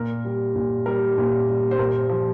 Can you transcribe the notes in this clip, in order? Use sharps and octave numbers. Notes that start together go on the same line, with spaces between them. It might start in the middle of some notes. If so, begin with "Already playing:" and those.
Already playing: A#2 A#4
G3
A#2
G3 A#4
A#2
G3
C5
A#2 A#4
F3